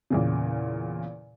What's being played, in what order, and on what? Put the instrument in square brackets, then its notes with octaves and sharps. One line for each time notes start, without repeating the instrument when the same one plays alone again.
[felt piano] E2 A#2 C#3